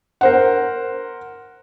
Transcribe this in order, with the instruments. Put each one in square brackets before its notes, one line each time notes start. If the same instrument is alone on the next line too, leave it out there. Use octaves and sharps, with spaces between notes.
[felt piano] A#4 C5 F#5